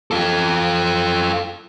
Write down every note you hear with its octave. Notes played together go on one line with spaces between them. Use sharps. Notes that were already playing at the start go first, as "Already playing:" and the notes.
F4 A4